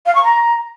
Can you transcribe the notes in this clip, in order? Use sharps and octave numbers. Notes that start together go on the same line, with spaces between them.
F5
C#6
A#5